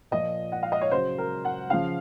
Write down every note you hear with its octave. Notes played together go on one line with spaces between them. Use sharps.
A#2 F3 D#5
F#5
F5
D#5
C#5
C#3 F#3 C5
A#4
F#5
C#3 F3 F5